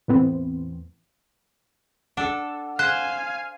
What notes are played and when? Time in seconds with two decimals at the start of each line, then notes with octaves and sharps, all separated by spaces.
0.08 E2 A2 E3 B3 C4
2.17 D4 A4 F#5
2.79 C5 F5 G#5 F#6